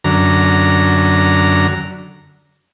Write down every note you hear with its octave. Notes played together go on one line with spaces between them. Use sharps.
F#2 D3 A#5